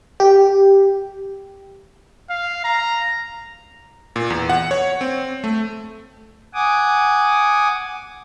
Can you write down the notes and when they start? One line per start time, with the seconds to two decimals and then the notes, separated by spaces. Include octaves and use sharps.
0.20 G4
2.30 F5
2.64 A#5
4.16 A#2
4.30 E2
4.50 F#5
4.71 C#5
5.01 C4
5.44 A3
6.54 F#5 G#5 D6 D#6